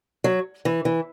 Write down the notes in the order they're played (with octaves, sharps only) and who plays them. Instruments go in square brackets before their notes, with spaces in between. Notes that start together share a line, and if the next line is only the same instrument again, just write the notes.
[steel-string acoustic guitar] F#3
E3
E3